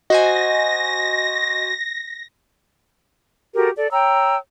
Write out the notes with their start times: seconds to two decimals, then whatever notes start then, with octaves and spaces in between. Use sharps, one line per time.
0.10 F#4 C5 D#5 G#5 A#6
3.55 F#4 G4 A4 A#4
3.77 A4 D5
3.92 C#5 G5 A#5 E6